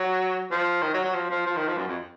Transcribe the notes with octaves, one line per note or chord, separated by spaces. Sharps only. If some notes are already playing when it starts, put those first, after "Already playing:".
Already playing: F#3
F3
D#3
F#3
F#3
F3
F3
F3
D#3
F3
F#2
F2